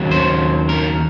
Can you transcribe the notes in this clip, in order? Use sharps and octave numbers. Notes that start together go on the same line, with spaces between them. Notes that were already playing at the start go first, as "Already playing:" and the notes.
Already playing: D#2 C#3 F#3
C5
A#4